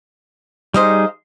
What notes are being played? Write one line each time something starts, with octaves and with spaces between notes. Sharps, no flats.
G3 D#4 G#4 C5 D#5 F5